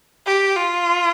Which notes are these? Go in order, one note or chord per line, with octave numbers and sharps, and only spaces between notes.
G4
F4